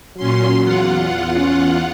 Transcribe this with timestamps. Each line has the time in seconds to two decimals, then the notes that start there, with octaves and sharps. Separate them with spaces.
0.17 A#2 F#3 C#4 C6
0.63 E2 F4 F#5
1.37 C#4